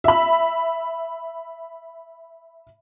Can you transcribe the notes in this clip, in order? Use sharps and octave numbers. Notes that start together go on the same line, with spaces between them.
E5 B5